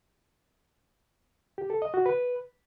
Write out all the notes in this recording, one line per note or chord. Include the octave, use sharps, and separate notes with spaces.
G4
A4
D#5
F#4
B4